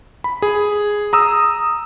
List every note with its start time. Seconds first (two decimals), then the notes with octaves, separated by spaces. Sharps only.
0.24 B5
0.42 G#4
1.13 A#5 D#6 E6